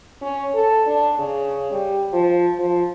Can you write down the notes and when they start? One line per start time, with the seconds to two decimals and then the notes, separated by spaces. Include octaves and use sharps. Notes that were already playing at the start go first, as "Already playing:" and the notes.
0.22 C#4
0.55 A4
0.86 D4
1.18 C#3
1.72 G3
2.13 F3
2.59 F3